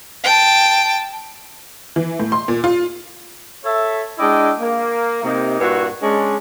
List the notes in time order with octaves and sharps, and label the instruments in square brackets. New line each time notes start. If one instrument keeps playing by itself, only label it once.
[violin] G5 A5
[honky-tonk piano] E3
A2
C6
A#2
F4
[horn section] A4 C#5 E5
G#3 D4 E4 D5 D#5 G5
A#3
C3 A#3 D#4
G2 A#2 E4 F#4
G#3 C#4 D4